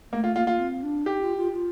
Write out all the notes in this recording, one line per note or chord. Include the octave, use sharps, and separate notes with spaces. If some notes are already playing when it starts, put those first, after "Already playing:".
A3 A#3
F4
A#3 F4
F4
C4
D4
D#4 G4
F4
F4
F4